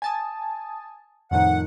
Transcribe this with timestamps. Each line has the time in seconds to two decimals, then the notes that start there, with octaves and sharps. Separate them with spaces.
0.02 G#5 A5 D#6
1.31 F2 A2 D#3 F#5